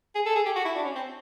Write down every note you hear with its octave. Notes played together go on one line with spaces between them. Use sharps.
G#4
A4
G#4
G4
F#4
E4
D4
C#4
C4